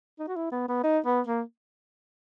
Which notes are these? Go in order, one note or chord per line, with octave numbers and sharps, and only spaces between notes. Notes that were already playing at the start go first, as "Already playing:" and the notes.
D#4
F#4
E4
B3
B3
D#4
B3
A#3